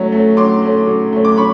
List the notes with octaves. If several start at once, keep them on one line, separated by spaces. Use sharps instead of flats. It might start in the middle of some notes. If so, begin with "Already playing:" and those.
Already playing: F#3 A3 C#4
A3 C#4
F#3 C6 D6
A3 C#4
F#3
A3 C#4
D6
F#3 B5 C#6